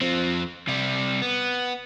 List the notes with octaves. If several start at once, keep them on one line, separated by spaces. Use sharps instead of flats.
F3 C4
C3 G3
B3